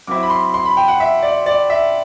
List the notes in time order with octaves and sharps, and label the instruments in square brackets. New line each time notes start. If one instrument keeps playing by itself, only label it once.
[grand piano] F#3 C4 E4 D6
B5
C6
C6
B5
G5
F#5
E5
D5
D5
E5